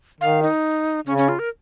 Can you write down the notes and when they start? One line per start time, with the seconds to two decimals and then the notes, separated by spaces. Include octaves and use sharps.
0.21 D#3 F5
0.42 D#4
1.07 C#3 C#4
1.18 C#4
1.28 F4
1.39 A#4